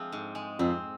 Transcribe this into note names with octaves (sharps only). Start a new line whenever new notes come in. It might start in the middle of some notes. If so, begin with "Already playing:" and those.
Already playing: F3 G#3 C4
G#2
G#3
F2 C4